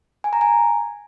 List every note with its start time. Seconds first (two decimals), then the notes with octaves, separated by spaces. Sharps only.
0.24 G#5
0.33 A#5
0.41 G#5